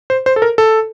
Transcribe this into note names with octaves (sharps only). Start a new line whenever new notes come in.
C5
C5
A4
A#4
A4